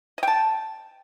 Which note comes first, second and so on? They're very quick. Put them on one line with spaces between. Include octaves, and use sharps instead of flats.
D#5 G5 A5